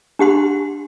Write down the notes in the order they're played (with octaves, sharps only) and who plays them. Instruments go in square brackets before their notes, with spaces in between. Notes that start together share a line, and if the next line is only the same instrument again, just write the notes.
[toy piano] D4 G4 F#5 C6